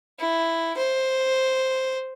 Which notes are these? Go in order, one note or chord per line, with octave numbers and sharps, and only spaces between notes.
E4
C5